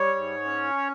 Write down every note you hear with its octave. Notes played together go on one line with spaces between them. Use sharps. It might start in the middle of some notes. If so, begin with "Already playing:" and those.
Already playing: G3 C#5
G#2
C#4